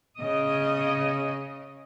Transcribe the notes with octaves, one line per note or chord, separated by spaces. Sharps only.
C#3 D#5